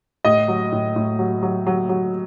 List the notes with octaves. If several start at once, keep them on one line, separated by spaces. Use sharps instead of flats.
A2 D#5
F#3
A2
A2
F#3
F#3
F#3
F#3